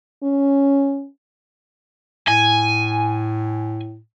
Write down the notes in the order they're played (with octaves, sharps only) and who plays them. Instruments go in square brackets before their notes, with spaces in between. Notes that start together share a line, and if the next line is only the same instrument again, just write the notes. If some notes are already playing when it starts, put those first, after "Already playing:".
[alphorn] C#4
[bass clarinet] A2 [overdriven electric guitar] G#5